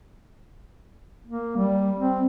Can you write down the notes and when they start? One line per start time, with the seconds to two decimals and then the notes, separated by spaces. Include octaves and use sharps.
1.27 A#3
1.57 G3
1.98 C4